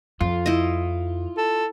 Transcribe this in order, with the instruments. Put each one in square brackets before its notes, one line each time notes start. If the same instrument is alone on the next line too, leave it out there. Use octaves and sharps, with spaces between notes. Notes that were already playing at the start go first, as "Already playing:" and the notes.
[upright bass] F2 [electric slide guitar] F4
[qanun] E4 D#5
[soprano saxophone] A4